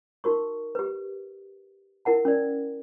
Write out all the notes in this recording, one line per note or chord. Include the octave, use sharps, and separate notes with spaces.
D#4 F#4 A#4 C#6
G4 B4
E4 A#4 F#5 A5
C#4 A#4 D5